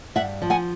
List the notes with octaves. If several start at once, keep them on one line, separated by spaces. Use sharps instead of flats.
G2 E5 F#5
F3
F#5 G#5